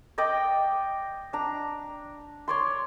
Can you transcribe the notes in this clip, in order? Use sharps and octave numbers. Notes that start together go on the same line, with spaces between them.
D5 D#5 G5 D6
D4 A#5
C#5 D5 C6